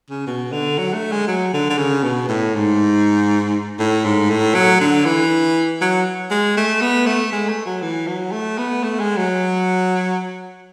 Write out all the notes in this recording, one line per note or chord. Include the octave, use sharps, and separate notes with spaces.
C#3
B2
D3
F#3
A3
G#3
F#3
D3
D3
C#3
B2
A2
G#2
A2
G#2
A2
F#3
D3
E3
F#3
G#3
A3
B3
A3
G#3
A3
F#3
E3
F#3
A3
B3
A3
G#3
F#3